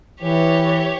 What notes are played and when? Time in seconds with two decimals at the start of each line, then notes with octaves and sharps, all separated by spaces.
0.21 E3 G4 C#5